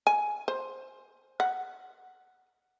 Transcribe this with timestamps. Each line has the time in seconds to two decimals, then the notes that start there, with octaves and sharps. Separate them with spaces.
0.07 G#5
0.48 C5
1.40 F#5